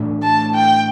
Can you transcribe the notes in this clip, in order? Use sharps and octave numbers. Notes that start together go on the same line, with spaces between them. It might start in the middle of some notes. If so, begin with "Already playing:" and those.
Already playing: A2 E3 A3 D4
A5
G5